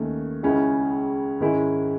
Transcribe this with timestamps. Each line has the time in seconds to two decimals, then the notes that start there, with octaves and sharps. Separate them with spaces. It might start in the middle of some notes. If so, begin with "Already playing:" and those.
Already playing: D#2 D#3 A3 C#4
0.43 C#2 C#3 G#3 C#4 E4
1.40 G#2 D#3 G#3 C#4 E4